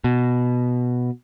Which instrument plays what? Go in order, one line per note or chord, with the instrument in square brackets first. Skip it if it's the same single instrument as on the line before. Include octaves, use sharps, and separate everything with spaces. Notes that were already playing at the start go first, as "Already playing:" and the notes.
[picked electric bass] B2